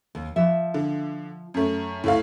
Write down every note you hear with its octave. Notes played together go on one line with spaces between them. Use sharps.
D#2
F3 E5
D3
F#2 A3
D2 A2 A3 F5